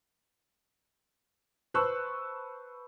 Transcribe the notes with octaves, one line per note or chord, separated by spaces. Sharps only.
B4 C5 A5 C#6 E6 F#6